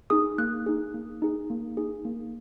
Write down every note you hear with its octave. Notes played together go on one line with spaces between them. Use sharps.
D#4 G#4 D#6
A#3 F#6
D#4 G#4
A#3
D#4 G#4
A#3
D#4 G#4
A#3